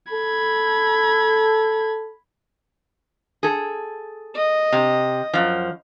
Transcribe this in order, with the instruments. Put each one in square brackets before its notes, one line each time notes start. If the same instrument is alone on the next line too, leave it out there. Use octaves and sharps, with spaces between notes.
[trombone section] A4 [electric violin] B5 G#6
[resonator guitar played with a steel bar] G#4 A4
[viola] D#5
[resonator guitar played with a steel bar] C3
F#2 F3